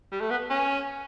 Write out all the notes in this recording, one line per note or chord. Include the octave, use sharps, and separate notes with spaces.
G3
A3
B3
C#4